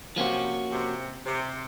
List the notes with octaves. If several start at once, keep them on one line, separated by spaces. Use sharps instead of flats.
C3 F3 A#3 C#4 F#4
C3
C3